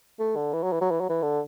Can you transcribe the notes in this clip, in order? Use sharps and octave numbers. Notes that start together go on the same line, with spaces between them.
A3
D3
E3
F#3
E3
F#3
E3
F#3
E3
D3